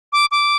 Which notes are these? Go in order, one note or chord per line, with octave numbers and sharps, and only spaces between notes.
D6
D6